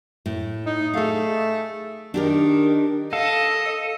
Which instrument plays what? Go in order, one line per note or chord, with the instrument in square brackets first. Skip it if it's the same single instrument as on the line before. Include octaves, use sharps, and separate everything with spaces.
[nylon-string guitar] A2
[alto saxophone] D#4
[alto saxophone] A3 [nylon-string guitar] G#4 F5
[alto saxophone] D#3 [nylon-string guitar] D4 G4 A#4
[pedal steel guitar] A4 [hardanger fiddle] D#5 [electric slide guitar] F5